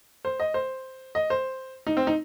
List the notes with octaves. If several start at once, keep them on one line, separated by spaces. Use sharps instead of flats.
C5
D#5
C5
D#5
C5
D#4
C4
D#4